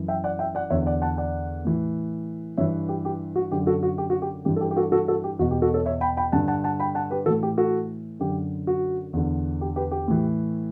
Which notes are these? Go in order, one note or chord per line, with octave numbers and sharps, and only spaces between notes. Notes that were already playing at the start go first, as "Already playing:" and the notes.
Already playing: F#2 E3
E5 G5
D5 F#5
E5 G5
D5 F#5
E2 D3 C#5 E5
D5 F#5
F#5 A5
D5 F#5
A2 E3
G2 E3 C#5 E5
G4
G4
F#4
F#2 D3 G4
F#4 A4
F#4
G4
F#4
G4
G2 E3 G4
A4
G4
G4
F#4 A4
F#4 A4
F#4 A4
G4
E2 B2 F#4
G4
F#4 A4
A4 C#5
C#5 E5
G5 B5
G5 B5
G2 D3 F#5 A5
F#5 A5
F#5 A5
G5 B5
F#5 A5
G4 B4
A2 E3 F#4 A4
G4
F#4 A4
F#2 D3 G4
F#4
E2 D3
G4
G4 B4
G4
A2 E3